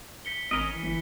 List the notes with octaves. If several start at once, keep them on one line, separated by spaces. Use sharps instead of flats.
B6 C#7 G7
G#1 C#4 A#4 D#5
E3
G1